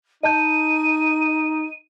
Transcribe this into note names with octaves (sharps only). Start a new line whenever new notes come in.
D#4 D#5 A5 G6 D#7